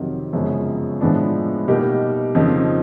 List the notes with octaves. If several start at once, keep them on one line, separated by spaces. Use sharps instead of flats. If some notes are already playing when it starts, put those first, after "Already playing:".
Already playing: F2 C3 D#3 F#3
F#2 C#3 F3 G#3 B3
A2 F3 G#3 B3 D4
B2 G3 A#3 D#4 G4
F2 C#3 F3 A#3 D#4